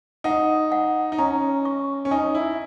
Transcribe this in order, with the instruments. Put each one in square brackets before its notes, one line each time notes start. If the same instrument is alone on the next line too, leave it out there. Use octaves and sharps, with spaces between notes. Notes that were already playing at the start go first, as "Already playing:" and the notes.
[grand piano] D#4 [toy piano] F#5
[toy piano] F#5
[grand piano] D#4
[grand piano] C#4 [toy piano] A#5
[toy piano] C#6
[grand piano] C#4
[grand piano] D#4 [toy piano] G#5
[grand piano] E4